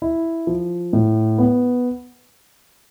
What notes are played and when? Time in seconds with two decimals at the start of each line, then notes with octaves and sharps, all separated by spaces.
0.02 E4
0.47 F3
0.93 A2
1.38 B3